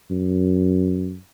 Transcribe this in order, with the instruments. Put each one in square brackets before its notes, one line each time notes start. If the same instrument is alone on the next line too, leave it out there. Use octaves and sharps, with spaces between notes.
[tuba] F#2